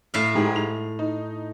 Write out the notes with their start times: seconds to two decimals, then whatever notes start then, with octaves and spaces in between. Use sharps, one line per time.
0.14 A2 E5 F5
0.35 G#2 G4 G#4
0.56 F7
0.99 D#4